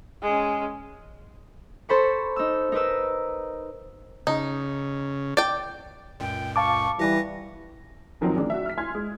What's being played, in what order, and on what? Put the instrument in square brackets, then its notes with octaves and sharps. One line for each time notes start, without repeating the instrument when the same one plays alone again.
[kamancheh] G#3 C#4
[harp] A4 C5 B5 C#6
D#4 E6
D#4 A#4 B4 E6
[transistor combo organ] C#3 [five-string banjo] D#4
[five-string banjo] D5 G5
[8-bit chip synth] C#2 F#2 A#2 [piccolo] G5
[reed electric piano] F5 A5 D6 [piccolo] C#6
[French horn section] E3 G3 [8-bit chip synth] G4 B4 [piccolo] A#6
[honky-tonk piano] F2 D#3 F3 F#3 C4
A1 C#3 D4
F#4 E5
F6 B6
G#5 C6 F6 G#6
G#3